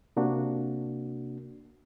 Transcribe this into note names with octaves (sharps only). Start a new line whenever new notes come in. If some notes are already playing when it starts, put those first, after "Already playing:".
C3 A#3 D4 F#4